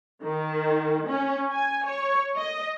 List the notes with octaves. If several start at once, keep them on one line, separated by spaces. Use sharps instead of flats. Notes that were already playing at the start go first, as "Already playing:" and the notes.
D#3
C#4
G#5
C#5
D#5